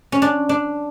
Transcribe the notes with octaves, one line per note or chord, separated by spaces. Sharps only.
C#4
D4
D4